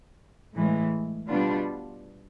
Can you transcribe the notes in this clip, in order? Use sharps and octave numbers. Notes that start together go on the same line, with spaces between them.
A2 E3 G#3
B2 G3 B3 D4 F4